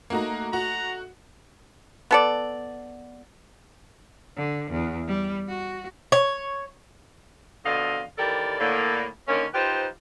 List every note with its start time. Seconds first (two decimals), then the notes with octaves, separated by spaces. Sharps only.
0.10 A3 A#3 D#4 F#4 A#5
0.53 F#4 A#5
2.11 B3 A4 D5
4.37 D3
4.71 E2
5.08 G3
5.48 F#4
6.12 C#5
7.65 F2 B2 D3 D#5 F5
8.18 D#2 E3 G4 A4 A#4 D5
8.59 A2 D3 A#3
9.28 D3 D#3 A#3 C#4
9.54 D#4 F4 G4 B4 C5